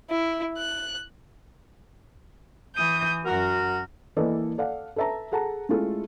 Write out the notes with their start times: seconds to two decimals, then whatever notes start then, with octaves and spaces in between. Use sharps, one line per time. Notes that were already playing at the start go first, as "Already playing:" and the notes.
0.10 E4
0.58 F#6
2.73 E3 D#6 G6
3.25 F#2 F#4 A#4
4.17 E3 A#3 A4 B4 D5 D#5
4.58 A4 D5 F5 F#5
4.96 A4 B4 E5 A5 A#5
5.32 G#4 A4 F#5 A5 A#5
5.69 G#3 A3 C#4 E4 F4 A4